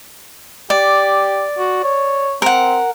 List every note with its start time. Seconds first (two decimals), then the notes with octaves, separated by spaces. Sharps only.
0.70 G4 D5
1.58 F#4
1.84 C#5
2.42 C4 A#4 F#5